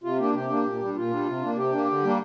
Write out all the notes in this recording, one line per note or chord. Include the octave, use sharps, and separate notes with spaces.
C3 F4
A#3 D4 G4
C3 G4
A#3 D4
A#2
G3 D4
A#2 F4
G3 D4
C3
A#3 D4
C3 G4
A#3 D4
D3
G3 A#3 D4